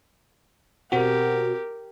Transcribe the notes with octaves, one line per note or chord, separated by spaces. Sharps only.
B2 C4 F#4 G4 A#4